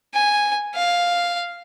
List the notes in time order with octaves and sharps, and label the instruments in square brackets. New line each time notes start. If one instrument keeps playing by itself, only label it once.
[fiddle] G#5
F5